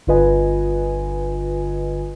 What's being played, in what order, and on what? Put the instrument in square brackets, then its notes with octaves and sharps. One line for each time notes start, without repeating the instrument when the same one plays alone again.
[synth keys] G1 D3 F4 B4 D#5 G#5